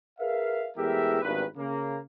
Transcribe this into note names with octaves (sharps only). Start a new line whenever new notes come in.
G#4 A#4 B4 E5 F5
E2 A2 G#3 G4 A#4 E5
G#1 E2 G2 D#3 B4
C#3 A#3